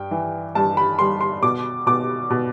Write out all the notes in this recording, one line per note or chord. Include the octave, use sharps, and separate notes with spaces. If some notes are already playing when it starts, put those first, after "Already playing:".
Already playing: G2 G5
E3
G2 A5
B5
G3 C6
C6
B2 D6
B2 D6
B2